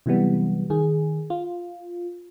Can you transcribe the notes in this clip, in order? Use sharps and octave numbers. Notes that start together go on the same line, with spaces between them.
C3 E3 F#3 G3 B3
D#3 G#4
F4